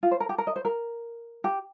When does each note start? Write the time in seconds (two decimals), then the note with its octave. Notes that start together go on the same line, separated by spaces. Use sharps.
0.03 F4
0.11 C5
0.20 A#4
0.29 G4
0.38 A#4
0.47 D#5
0.56 C5
0.65 A#4
1.44 G4